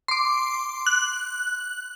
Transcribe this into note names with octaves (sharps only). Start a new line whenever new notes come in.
C6 D6
F#6